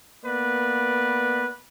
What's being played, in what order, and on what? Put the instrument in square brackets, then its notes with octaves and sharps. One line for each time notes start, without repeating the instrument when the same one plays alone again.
[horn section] A#3 B3 B4 D5